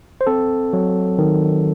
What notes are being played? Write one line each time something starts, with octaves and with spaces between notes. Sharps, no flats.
C5
C4 A4
F#3
D#3